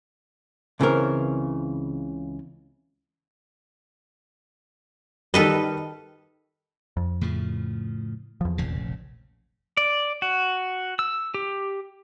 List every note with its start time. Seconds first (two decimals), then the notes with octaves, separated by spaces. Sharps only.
0.80 C#2 C#3 E3 C4 A#4
5.34 D#3 G3 A4 B4 D#5
6.97 F2
7.21 A2 C#3 F3
8.41 E2 F3
8.58 F1 A#1 C#3
9.77 D5
10.22 F#4
10.99 E6
11.34 G4